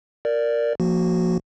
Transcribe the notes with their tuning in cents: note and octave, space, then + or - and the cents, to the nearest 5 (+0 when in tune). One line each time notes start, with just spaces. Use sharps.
A#4 -5 D5 +0
F3 +0 A#3 +0 F#4 +0